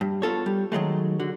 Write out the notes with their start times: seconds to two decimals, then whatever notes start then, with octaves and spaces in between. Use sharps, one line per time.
0.01 G2
0.22 B3 F4 A4 C#5
0.46 G3
0.72 D#3 F#3 G#3 A3
1.20 D3 F#4